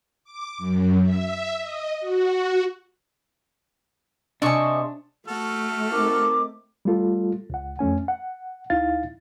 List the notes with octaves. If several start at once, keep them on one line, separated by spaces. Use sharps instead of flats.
D6
F#2
E5
D#5
F#4
C3 D4 D#5 E5 G#5 C#6
A3 F#4 A4 F6
C4 D#4 A#4 D6
G3 A3 F4 A4
C#2 F#5
F2 A3 C#4 G#5
F#5
D2 D#4 E4 F5 A6